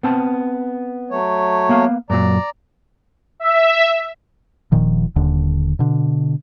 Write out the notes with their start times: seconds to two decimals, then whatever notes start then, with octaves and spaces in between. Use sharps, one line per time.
0.03 B3 C4 A5
1.10 F#3 A3 C#5
1.69 A#3 B3 F5
2.10 F#2 A#2 F#3 D5 A#5
3.40 E5
4.72 D#1 A#2 D#3 F3
5.16 D#1 D#2 D3
5.79 B2 D3